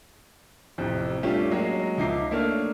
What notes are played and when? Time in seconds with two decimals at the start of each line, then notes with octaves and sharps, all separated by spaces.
0.78 A1 F2 C3
1.23 G3 A3 C#4 D4 F4 G4
1.51 F#3 G#3 A#3 C#4 F#4
1.98 C#2 F3 D#4 E5 D6 C7
2.31 A3 A#3 D4 C#5 F6